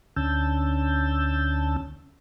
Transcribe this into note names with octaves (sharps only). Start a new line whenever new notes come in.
D2 D3 C#4 A5 E6 G6